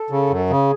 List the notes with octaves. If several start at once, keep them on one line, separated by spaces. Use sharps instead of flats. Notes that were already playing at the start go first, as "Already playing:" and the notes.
Already playing: A4
C#3
F#2
C#3 G#4